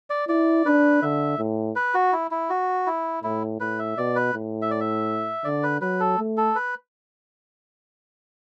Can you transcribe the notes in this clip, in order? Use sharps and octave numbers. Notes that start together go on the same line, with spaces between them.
D5
E4 D5
D4 B4
D3 E5
A2
B4
F#4
E4
E4
F#4
E4
A2 E4
A2 B4
E5
B2 D5
B4
A2
E5
D5
E5
D3 D5
B4
F#3 B4
A4
A3
A4
B4